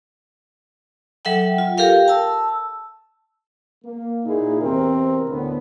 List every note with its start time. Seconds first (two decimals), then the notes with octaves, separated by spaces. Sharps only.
1.25 F#3 A4 E5 F#5 G5
1.58 F4
1.78 G4 A4 A#4 F5 G5
2.08 A5 E6
3.84 A#3
4.25 A#2 D#4 E4 G#4
4.59 E2 C3 C4 A#4
5.28 D2 A2 B3